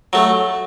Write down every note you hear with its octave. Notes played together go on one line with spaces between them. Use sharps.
F#3 A3